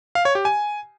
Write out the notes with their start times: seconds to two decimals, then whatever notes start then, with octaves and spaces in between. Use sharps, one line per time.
0.15 F5
0.25 C#5
0.35 G4
0.45 G#5